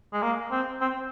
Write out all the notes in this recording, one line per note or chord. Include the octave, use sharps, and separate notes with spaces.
G#3
A#3
C4
C4